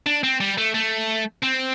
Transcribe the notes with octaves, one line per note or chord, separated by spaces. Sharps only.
D4
C4
G3
A3
A3
C4